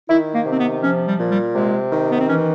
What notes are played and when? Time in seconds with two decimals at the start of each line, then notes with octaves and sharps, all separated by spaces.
0.08 D#3 E4
0.33 A#3
0.45 C3
0.52 C4
0.57 B3
0.82 F3 C#4
1.06 G3
1.18 A#2
1.30 G3
1.55 C3 G#3
1.92 D#3
2.09 B3
2.19 C4
2.28 E3 C#4